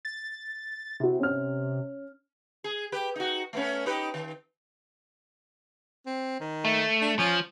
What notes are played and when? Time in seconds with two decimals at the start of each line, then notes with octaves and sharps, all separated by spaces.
0.05 A6
1.00 C3 E4 F#4
1.20 C#4 F6
2.64 G#4
2.92 G4 B4
3.16 D#4 F#4
3.53 A3 B3 C#4
3.86 D#4 G4 B4
4.14 D#3
6.06 C4
6.40 D#3
6.65 A3
7.01 D4
7.19 F3 C#4